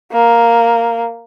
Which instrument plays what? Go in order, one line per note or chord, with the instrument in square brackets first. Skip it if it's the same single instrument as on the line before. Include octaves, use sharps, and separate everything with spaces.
[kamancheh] A#3